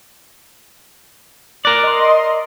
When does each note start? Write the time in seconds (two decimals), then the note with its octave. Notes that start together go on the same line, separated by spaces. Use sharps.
1.65 A#4 D5 F#6
1.83 D#5 C6